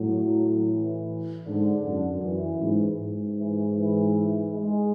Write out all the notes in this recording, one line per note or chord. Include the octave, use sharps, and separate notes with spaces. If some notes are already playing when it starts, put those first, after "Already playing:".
Already playing: A2 F#3
E3
G#2 D3
F#2
F#2 E3
G#2
G#2
E3
E3
G#3